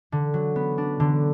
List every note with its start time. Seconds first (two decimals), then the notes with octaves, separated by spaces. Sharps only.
0.12 D3
0.34 F#3
0.56 B3
0.78 D4
1.00 D3